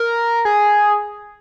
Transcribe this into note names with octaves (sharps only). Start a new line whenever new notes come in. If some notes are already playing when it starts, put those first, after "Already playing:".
Already playing: A#4
G#4